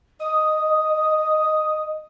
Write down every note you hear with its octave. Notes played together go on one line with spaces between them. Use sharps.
D#5 D#6